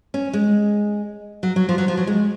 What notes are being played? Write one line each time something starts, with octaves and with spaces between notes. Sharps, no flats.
C#4
G#3
F#3
F#3
F3
F#3
F3
F#3
G#3